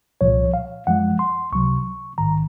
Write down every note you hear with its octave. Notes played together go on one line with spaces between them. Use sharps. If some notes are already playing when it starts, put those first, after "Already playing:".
C2 A#2 F3 C#5
F5
F#2 F3 G#3 F#5
C6
C#2 C3 F#3 C#6
A#1 G#2 D#3 A#5